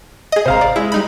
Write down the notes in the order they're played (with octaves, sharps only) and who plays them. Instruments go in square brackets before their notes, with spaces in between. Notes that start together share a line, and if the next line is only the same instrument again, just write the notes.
[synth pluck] G#4 D#5
[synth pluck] G#1 C3 [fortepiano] C5 F5 A#5
[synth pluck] D5
[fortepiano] G#3 [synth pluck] E4
[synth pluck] G3 D#4 B5